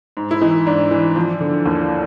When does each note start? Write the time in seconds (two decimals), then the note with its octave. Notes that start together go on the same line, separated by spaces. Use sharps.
0.17 G#2
0.31 E4
0.41 E3 D#4
0.66 G#2 D4
0.91 E3
1.16 F3
1.41 D3
1.66 D#2